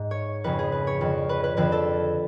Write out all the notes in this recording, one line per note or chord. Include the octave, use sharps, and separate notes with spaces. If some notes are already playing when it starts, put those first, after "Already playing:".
Already playing: G#2
C#5
F2 C#3 B4
G#4
B4
C#5
F2 D3
B4
B4
F2 D3 B4
A4